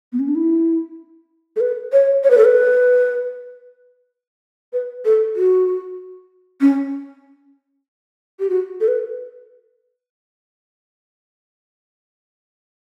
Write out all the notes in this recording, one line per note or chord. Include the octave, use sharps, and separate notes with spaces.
B3
C#4
D4
E4
A4
B4
C#5
C#5
B4
A4
B4
B4
A4
F#4
C#4
G4
F#4
A4
B4